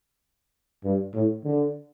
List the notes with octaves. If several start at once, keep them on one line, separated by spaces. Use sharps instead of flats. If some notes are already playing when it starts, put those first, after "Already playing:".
G2
A2
D3